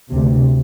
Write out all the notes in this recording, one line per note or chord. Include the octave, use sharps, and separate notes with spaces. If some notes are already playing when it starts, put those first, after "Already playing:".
D2 C3